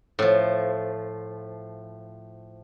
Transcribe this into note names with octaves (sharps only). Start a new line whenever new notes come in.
A2 F3